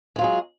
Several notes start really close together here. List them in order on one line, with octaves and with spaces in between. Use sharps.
G#3 F4 F#3 G#4